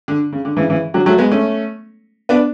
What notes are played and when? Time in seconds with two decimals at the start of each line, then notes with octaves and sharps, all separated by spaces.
0.08 D3
0.32 C#3
0.45 D3
0.57 C#3 E3
0.69 C#3 E3
0.94 D3 F#3
1.06 F#3 A3
1.18 G#3 B3
1.31 A3 C#4
2.29 B3 D4